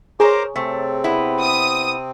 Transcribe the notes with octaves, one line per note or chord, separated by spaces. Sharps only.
G#4 A#4 C5 C#5 A#5 C6 D6
C3 A3 C4
B3 E4
D#6